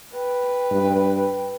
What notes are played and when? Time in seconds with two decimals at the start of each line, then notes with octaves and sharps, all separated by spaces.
0.14 B4 G5
0.71 G2